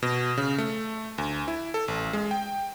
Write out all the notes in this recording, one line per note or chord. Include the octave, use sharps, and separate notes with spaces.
B2
C#3
A3
D2
E4
A4
A1
G#3
G5